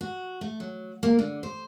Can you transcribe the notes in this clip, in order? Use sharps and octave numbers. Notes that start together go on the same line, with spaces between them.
F#4
A3
F#3
A#3
D3
C5